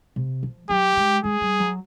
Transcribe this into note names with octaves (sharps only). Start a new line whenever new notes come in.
C3
F3
F#3 G4
G#3
G#3 G#4
G3
F#3